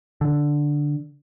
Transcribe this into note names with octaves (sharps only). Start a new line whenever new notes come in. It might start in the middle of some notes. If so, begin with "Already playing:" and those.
D3